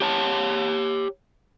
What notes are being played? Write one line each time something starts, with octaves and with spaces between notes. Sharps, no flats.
G4 C#5 A5